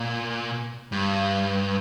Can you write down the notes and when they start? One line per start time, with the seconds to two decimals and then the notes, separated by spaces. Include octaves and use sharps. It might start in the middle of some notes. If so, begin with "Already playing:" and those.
Already playing: A#2
0.92 G2